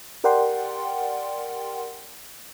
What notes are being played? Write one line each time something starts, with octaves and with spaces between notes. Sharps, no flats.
G4 A#4 D5 F#5 G5 C6